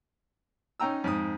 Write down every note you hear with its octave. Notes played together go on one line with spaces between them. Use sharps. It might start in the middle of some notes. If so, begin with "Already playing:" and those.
C#4 D#4 G5 A#5 E6
F2 G#2 D#6